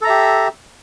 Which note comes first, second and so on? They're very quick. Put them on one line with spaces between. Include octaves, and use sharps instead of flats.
A4 A#5 E5 G4